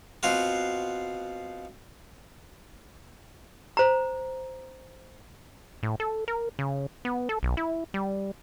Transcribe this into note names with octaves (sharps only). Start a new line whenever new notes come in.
B2 C4 F4 F#4
C5 A#5
A2
A4
A#4
C#3
B3
A4
B1
E4
G3